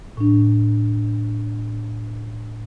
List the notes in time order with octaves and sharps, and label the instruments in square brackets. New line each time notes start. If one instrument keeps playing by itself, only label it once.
[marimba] A2 D4